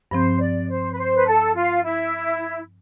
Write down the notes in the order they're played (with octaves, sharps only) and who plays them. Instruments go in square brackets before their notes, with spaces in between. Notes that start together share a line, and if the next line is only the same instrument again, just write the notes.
[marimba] G2 F3 C4 [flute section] C5
[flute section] D5
C5
B4
C5
B4
A4
F4
E4